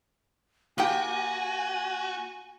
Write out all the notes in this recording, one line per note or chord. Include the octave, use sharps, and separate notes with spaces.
A#3 F#4 G4 G5 G#5